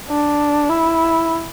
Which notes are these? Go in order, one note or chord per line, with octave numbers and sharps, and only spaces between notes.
D4
E4